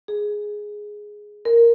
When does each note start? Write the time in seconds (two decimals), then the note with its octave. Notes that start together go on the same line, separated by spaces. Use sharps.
0.08 G#4
1.45 A#4